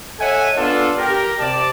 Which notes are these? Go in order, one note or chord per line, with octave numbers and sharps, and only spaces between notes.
A4 C#5 D#5 E5 F#5 G#5
B3 D4 F4 A4
G4 A#4
C3 D5 A5